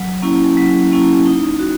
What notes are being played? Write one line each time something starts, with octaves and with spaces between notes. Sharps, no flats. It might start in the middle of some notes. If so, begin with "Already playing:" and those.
Already playing: F#3
A#3 C#4 E4
F#3
A#3 C#4 E4
D#4
F#4